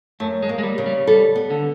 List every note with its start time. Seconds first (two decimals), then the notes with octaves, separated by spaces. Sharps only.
0.20 F#2 A3
0.42 G#3
0.49 A#3
0.58 G#3
0.63 G3
0.78 C#3
0.86 G3
1.07 G3 A4
1.36 B3
1.50 D3